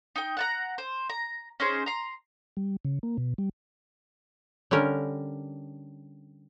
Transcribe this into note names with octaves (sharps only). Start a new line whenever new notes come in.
D#4 G5
F#5 A5 A#5
C5
A#5
C#4 D#4 G#4 C5
A#5 C6
G3
C#3
A#3
B2
G3
D3 G3 C#4 A#4